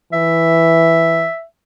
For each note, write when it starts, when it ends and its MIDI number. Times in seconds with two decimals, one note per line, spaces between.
0.13 1.27 52
0.13 1.44 76